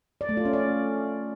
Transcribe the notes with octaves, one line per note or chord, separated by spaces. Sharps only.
D5
A3
F4
C#4
D5